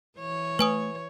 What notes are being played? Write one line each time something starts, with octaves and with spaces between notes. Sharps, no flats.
E3 C#5
A3 B4 G#5 D#6